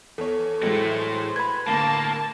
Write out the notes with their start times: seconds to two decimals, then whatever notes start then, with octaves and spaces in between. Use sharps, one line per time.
0.18 E2 A4 C#5
0.62 A2 E3 F#3 G#3 A3 C5
1.36 B4 B5 G#6
1.68 G1 A2 A#3 A5